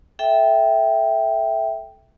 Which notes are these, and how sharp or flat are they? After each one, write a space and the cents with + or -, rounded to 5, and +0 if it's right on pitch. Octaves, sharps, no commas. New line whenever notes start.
A4 -15 E5 +0 G5 +0